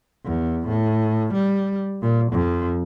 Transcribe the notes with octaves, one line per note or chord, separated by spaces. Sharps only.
E2
A2
G3
A#2
F2